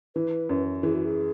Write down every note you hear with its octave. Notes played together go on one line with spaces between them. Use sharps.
E3 B4
F#2
E3 G#4
F#4
G#4